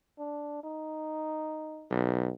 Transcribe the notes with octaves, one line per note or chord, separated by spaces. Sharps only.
D4
D#4
B1